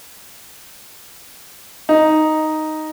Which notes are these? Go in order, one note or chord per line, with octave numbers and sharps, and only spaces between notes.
D#4